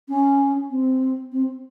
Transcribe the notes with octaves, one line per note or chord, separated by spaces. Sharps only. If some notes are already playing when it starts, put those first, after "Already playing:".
C#4
C4
C4